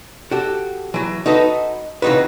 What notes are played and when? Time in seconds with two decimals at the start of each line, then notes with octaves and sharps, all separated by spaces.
0.31 F#4 G4 A4
0.94 E3 F#3
1.26 D#4 F#4 A4 B4 D#5
2.02 C#3 E3 C4 D#4 F#4 B4